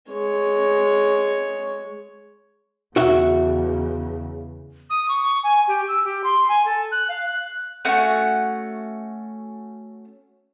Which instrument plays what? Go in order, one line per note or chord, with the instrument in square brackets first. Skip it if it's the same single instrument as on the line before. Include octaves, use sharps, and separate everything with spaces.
[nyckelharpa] G#3 C#5
[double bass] E2 C#3 [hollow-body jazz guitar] F#4 E5
[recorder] D#6
C#6
G#5
G4
E6
G4
C6
G#5
A4
F#6
F5
F#6
[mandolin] A3 C#4 F#4 F#5